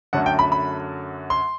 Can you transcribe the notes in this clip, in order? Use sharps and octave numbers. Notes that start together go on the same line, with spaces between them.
F#2 D3 F#3 A3 F#5
G5
B5
B5
C6